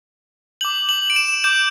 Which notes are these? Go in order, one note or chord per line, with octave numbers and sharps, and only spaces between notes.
D6 G6 F#7
F#7
D7
E7
D6 G6 E7